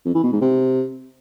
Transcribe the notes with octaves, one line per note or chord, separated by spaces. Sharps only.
F2
E3
B2
G#2
C3